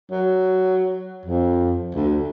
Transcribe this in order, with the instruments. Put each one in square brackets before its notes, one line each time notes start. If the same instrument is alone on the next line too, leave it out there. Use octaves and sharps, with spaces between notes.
[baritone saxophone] F#3
F2
D2